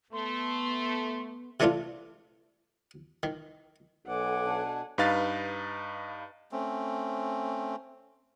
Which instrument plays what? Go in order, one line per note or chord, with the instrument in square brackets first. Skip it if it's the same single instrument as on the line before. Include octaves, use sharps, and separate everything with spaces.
[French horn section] A3 [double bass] B3 [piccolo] C6
[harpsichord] C3 E3 A3 D4 E4 F4
D#3
[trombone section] B1 [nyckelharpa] A4 D6 [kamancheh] F#5 G#5
[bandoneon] B2 D4
[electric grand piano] G2 D#4 B4 F5 A6
[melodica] A3 C4 C#4